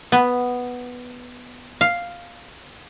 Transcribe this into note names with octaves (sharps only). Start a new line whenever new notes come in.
B3
F5